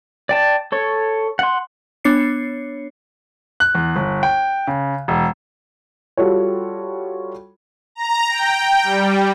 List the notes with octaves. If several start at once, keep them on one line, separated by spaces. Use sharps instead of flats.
D5 G5 A5
A4 C#5
F#5 C6
B3 D4 C#5 C7 C#7
F#6
E2
G1
G5
C#3
E1
G3 F4 F#4 A4 C#5
A#5
G5
G3